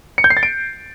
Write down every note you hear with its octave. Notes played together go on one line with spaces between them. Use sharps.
C#7
G6
C7
A6
D7